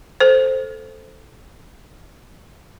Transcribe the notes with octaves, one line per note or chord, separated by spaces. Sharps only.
A4 C5